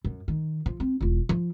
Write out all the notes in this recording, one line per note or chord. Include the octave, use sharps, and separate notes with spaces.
F#2
D#3
F3
C4
E1 F4
F3